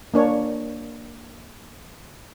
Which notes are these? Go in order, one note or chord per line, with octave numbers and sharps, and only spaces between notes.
A#3 D4 C#5